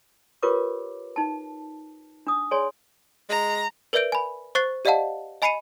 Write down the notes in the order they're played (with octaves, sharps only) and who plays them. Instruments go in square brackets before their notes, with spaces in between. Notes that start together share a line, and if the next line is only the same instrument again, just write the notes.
[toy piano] F4 G4 A#4 B4 C#5 D6
D#4 A5
D4 D#6
G#4 C#5 D5 G#5 C6
[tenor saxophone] G#3 [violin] A#5
[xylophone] A#4 B4 D5 E5 G6 D7
G#5 B5
C5 C#6 F#6 A6 C7
G4 D5 D#5 F5 F#5 A5
D#5 G#5 B5 C7 C#7 D#7